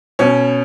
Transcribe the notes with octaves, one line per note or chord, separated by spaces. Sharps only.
B2 C#4